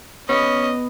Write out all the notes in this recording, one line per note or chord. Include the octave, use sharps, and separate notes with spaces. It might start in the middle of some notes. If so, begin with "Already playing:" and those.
B3 C#4 D#5